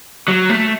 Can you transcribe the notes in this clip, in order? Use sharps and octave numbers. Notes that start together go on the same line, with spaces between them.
F#3
A3